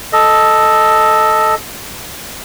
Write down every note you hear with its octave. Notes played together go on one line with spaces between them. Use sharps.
A4 D#5